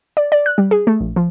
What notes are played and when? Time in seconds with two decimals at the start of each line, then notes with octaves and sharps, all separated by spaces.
0.17 D5
0.32 D5
0.46 F#6
0.58 G3
0.71 G#4
0.87 A3
1.00 A#1
1.16 F3